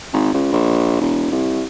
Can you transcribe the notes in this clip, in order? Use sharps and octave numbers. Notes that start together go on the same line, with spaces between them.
G#1
C#2
A#1
E1
C2